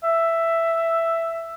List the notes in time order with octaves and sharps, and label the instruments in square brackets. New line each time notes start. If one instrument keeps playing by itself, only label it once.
[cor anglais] E5